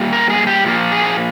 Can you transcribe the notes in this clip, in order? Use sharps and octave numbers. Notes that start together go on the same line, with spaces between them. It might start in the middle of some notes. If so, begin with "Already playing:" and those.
Already playing: A#2 G3 A#3
A#4
G#4
G4
A#2 F3 A#3
G#4